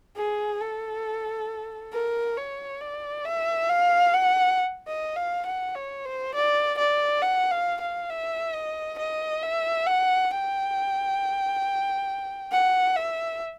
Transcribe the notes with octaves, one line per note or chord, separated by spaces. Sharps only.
G#4
A4
A#4
C#5
D5
E5
F5
F#5
D#5
F5
F#5
C#5
C5
D5
D5
F#5
F5
F5
E5
D#5
D#5
E5
F#5
G5
F#5
E5